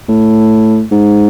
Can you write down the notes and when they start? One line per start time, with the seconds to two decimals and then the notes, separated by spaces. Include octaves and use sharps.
0.09 A2
0.92 G#2